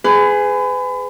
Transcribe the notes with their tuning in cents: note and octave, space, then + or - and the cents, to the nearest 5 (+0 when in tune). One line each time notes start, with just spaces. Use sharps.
G#4 +0 B4 +35